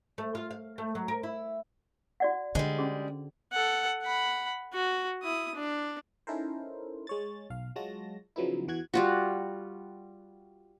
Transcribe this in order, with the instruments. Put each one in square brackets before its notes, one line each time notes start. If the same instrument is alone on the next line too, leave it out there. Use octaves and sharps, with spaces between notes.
[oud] A3
F4
F5
A3
F#3
A#4
E4
[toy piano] F#4 D5 F#5
[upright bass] D3 [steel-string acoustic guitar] G3 G#3 [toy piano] C5
[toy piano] C#4 F#4 G#4
[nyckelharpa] A4 F#5
F#5 B5
F#4
E4 D#6
D4
[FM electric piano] C#4 D#4 E4 A4 A#4 C5
G#3 C#5 A6
B1 F5
F#3 G#3 F4 F#4 A5 A#6
C#3 F3 F#3 B3 D#4 E4
E2 E3 F#4 F#6 G#6
[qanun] G3 F4 F#4